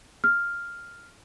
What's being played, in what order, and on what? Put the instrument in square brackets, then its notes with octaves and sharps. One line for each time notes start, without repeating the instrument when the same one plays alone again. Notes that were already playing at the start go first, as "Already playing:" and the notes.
[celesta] F6